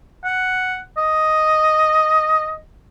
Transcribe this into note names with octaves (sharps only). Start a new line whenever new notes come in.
F#5
D#5